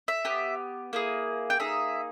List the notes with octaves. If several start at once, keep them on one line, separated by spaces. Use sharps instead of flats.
E5
B3 G4
A#3 E4 G#4
G5
A#3 D#4 G#4 E5